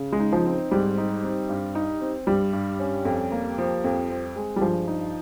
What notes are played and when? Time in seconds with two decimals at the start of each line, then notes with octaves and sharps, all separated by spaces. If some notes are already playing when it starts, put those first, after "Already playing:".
Already playing: C#3
0.13 G#3
0.20 D#4
0.32 F3
0.46 C4
0.71 G#2 G3
0.98 D#4
1.23 C4
1.49 G2
1.75 D#4
2.01 C4
2.27 G2 G3
2.53 G2
2.80 C#4
3.05 F2
3.32 A#3
3.58 F3
3.84 F2
4.10 C4
4.36 G#3
4.56 G3
4.61 G2 F3
4.87 D#4